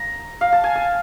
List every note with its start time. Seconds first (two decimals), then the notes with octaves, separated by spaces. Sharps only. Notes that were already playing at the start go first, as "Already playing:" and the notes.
Already playing: A#5
0.41 F5
0.53 A5
0.64 G#5
0.75 A5